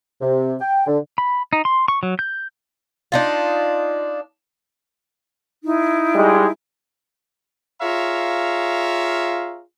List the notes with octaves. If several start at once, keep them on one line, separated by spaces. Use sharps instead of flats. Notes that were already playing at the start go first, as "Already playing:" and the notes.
C3
G5
D3
B5
D#4
C6
C#6
F#3
G6
D4 D#4 F4
D#4 E4
G3 G#3
F4 G#4 C#5 E5 F5 A#5